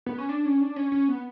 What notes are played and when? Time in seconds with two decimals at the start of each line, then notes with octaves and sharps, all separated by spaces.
0.06 B3
0.18 C#4
0.29 D4
0.45 C#4
0.61 D4
0.76 C#4
0.92 C#4
1.08 B3